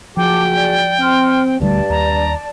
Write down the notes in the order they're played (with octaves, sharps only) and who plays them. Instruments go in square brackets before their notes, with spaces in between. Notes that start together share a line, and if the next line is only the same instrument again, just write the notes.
[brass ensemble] F#1 F#4 G#4 [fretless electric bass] F3 [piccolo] G5 [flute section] A5 D6
[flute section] D5
[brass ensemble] C4 [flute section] C6 F6
[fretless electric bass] D#1 D2 G3 [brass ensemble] G2 [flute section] D5 A5
[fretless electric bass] D#2 [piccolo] A#5